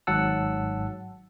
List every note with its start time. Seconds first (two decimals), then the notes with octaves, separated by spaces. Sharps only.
0.07 G#1 G#2 F#3 F#5 A5 E6